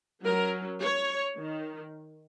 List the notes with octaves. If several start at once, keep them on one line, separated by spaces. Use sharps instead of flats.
F#3 C#4 A#4
C#5
D#3